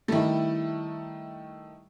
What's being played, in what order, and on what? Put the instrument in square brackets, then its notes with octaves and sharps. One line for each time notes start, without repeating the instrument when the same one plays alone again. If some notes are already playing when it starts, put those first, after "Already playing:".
[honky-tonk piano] D#3 A3 [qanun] G3 E4